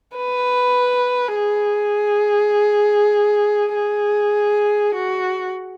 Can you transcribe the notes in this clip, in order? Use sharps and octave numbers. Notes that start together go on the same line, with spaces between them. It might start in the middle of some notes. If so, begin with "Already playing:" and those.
B4
G#4
G#4
F#4